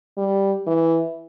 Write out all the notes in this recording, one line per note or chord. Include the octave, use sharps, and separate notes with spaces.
G3
E3